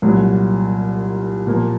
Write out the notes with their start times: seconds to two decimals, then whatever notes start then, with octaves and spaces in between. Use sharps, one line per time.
0.02 C2 A#2 F#3
1.47 A#2 F3 A#3